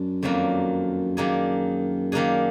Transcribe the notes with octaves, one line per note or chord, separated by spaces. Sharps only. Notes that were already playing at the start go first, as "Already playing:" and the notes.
Already playing: F#2 D4
F2 D#3 F#3 A#3 D4
D#3 A#3 D4 G#4
D#3 A#3 D4 G#4